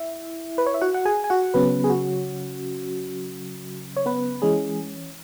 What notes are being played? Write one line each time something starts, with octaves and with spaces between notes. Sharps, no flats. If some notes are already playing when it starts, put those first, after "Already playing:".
Already playing: E4 E5
B4
C#5
E5
F#4 F#5
F#5
G#4 G#5
G#5
F#4 F#5
C#3 F#3 B3 C#4 B4
G#4
F#4
C#5
B3 B4
E3 G#3 C#4 G#4